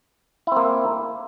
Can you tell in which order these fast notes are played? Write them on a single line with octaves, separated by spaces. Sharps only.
E4 C4 A#3